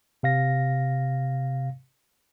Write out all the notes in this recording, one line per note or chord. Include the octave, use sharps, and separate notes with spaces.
C3 F5 A#6